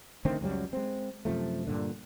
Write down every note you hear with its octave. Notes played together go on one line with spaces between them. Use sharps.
D3 D#3 A3 C4
C#2 F#2 F#3 G3
G#3 C4
F#2 C3 F3 A3
G2 A#2 D3